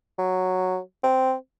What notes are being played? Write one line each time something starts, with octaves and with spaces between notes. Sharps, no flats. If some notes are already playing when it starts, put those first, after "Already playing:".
F#3
C4